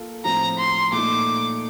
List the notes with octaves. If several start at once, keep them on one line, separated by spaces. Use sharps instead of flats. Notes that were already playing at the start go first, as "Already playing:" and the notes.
Already playing: A#3 F4 A4
A2 F3 C4 A#5
C6
A#2 A3 D#4 D6